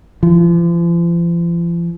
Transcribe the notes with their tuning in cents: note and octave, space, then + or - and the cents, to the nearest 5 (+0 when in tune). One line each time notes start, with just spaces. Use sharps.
F3 -40